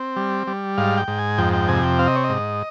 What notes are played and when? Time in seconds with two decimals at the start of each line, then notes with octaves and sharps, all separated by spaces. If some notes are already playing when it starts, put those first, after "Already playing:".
Already playing: C4
0.16 G3
0.47 G3
0.78 G#2 F5
0.97 G5
1.08 G#2
1.19 G#5
1.38 F2 G5
1.53 G5
1.68 C3 G#5
1.83 G5
1.99 C4 F5
2.07 D#5
2.16 C#5
2.24 D#5
2.29 G#2